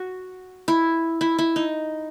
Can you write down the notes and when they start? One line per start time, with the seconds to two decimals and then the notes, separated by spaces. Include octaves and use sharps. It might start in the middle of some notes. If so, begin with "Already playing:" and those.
Already playing: F#4
0.68 E4
1.21 E4
1.38 E4
1.56 D#4